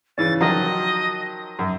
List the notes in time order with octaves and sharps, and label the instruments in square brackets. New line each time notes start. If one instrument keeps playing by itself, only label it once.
[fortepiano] C#3 E3 C#4 [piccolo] A6
[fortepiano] D#3 F3 F#3 [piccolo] D#5
[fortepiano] F#2